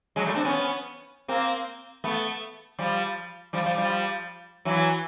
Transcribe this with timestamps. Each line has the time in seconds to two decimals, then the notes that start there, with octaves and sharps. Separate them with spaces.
0.16 F#3 G#3
0.26 G3 A3
0.35 C4 D4
0.45 B3 C#4
1.28 A#3 C4
2.04 A3 B3
2.79 F3 G3
3.53 F3 G3
3.66 F3 G3
3.78 F3 G3
4.65 E3 F#3